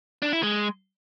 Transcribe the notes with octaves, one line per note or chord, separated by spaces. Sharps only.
D4
E4
G#3